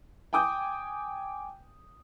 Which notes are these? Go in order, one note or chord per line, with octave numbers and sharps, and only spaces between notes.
G5 G#5 D6 D#6 G6